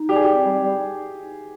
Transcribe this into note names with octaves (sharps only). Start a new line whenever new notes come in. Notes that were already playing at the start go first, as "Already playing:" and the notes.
Already playing: D#4
G3 G4
G#4
C4 G4
G3
G3